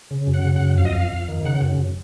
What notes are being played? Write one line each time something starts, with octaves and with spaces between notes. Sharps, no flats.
C#3
F#2
F#5
C#3
F#2 F#5
F2 F5
D#5
F2 F5
F2
D#3
C#3 F#5
F#2
F#2